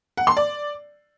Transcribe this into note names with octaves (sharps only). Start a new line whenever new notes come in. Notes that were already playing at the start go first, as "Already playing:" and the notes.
F#5
C6
D5